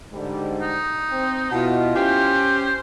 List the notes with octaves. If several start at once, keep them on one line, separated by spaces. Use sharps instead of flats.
G#2 D3 G3
D#4
C4
B2 E4 F4
C#4 G4 C5